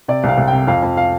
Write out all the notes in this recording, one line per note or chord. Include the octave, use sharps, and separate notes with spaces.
C3 D5
C2 F5
C2
C3 G5
F2 F5
F2
F5